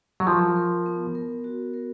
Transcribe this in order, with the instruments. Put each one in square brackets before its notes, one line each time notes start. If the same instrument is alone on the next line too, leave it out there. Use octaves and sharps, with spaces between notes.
[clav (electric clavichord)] F#3
[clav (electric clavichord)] F3 [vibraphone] A#4
[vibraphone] A#4
B3
A#4
F#4
A#4